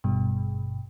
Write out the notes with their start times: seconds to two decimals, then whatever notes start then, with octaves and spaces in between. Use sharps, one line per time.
0.04 G#1 G2 B2